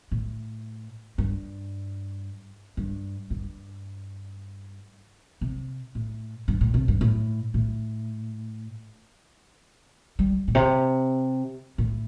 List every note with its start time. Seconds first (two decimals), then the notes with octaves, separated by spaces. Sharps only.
0.12 A2
1.18 G2
2.77 G2
3.30 G2
5.41 C3
5.95 A2
6.48 G2
6.61 A2
6.74 C3
6.88 G2
7.01 A2
7.54 A2
10.19 G3
10.48 A2
10.55 C3
11.78 A2